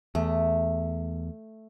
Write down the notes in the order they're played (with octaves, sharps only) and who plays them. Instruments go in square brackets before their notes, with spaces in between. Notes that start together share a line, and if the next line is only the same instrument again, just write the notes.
[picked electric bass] E2 [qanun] A3